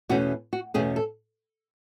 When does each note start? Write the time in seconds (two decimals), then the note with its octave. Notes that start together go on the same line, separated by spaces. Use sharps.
0.09 E2 B2 A3 C#4 F#4
0.53 F#4
0.74 E2 B2 A3 C#4 G#4
0.96 A4